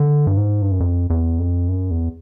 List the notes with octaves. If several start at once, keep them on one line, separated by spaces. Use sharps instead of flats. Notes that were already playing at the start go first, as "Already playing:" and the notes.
Already playing: D3
G2
G#2
G2
F#2
F2
E2
F2
F#2
E2